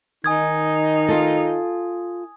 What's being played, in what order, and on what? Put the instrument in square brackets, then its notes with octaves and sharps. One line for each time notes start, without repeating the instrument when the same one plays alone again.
[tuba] D#3 [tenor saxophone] D#4 [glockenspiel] G#5 D#6 G#6
[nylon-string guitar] F4 A4